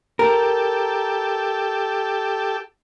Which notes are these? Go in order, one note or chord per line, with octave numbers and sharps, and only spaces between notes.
G4 A4 A#4